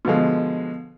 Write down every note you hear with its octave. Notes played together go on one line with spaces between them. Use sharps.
B2 D3 F3 G#3